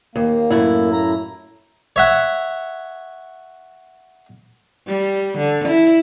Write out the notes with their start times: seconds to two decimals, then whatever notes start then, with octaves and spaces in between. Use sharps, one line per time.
0.16 D#2 A#3
0.51 F#2 A2 E4
0.93 A#5
1.96 C#5 E5 F#5
4.87 G3
5.38 D3
5.68 E4